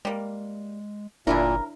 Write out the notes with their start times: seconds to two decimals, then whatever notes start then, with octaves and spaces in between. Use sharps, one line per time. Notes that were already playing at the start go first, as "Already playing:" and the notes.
0.05 G3 G#3 A#3
1.27 G1 A#2 C#3 F3 D4 E4 A#4